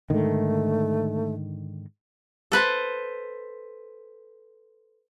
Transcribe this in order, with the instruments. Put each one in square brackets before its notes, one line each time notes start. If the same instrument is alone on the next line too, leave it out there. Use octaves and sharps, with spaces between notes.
[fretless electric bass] G#2 D3 D#3 [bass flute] A3
[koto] A4 B4 C5